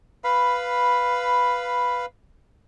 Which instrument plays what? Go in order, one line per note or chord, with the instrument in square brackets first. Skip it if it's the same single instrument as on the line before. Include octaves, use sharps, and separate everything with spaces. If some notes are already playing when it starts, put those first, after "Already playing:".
[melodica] B4 F5 B5